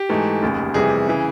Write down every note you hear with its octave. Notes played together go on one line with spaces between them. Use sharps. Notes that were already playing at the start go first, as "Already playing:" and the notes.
Already playing: G4
G#2 E3 A3
F1 D#2 C#3
F2 C3 E3 G3 B3 G#4
C#3 E3